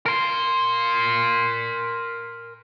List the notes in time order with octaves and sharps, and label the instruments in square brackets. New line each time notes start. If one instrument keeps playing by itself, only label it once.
[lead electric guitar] A#4 C6